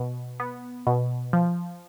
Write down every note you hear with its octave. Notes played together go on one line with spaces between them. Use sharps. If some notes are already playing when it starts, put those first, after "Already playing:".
Already playing: B2
B3
B2
F3